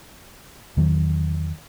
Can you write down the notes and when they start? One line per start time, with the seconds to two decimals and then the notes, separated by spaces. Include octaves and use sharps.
0.77 E2 D#3 F#3